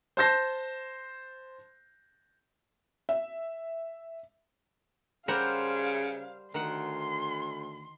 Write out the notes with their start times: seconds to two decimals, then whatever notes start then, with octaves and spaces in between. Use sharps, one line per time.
0.17 C5 A5 G6 A#6 C7
3.09 E5
5.28 C#3 G3 A#4 C5 F5 F#5
6.54 D2 D#3 F#5 C6